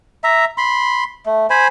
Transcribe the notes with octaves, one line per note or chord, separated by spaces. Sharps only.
E5 A#5
B5 C6
A3
C5 G#5 B5